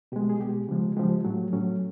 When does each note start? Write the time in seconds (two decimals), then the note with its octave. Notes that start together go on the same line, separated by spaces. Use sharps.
0.12 B2 G#3 G4
0.30 G#4
0.40 B2 G#3 G4
0.69 C#3 F3 G#3
0.97 C#3 F3 G#3 G4
1.25 A2 F#3 A3
1.53 A2 F#3 A3 C#4